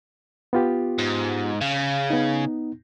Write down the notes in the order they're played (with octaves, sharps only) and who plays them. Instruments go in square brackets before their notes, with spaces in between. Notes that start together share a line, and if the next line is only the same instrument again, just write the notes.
[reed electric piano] B3 F4 G4
[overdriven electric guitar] G#2
C#3
[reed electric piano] B3 D#4